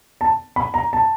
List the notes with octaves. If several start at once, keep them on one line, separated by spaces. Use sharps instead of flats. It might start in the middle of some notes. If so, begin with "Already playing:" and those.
A5
B5
A#5
A5